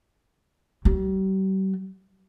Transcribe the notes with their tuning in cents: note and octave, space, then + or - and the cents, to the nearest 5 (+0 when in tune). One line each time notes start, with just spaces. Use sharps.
G3 -40